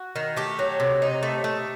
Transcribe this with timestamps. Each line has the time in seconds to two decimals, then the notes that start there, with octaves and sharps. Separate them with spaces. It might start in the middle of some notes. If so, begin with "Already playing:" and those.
Already playing: F#4
0.16 D#3
0.36 A3 G4
0.59 F#3
0.80 C3
1.02 D#4
1.23 A3
1.44 A3